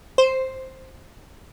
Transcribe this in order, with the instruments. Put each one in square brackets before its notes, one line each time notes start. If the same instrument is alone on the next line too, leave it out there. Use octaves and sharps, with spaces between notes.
[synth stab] C5